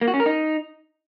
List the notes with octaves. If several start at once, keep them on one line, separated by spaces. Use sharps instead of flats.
A#3
F#4
C#4
A#4
D#4